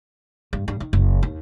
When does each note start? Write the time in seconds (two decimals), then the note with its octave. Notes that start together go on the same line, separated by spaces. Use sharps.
0.53 G2
0.68 G2
0.80 D#3
0.93 F#1
1.23 D#2